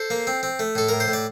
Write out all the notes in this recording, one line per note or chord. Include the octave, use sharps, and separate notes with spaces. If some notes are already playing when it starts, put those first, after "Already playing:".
Already playing: A4 C5
A#3
C4
C4
A3
A2 A4
A2 A#4
C5
A2
D5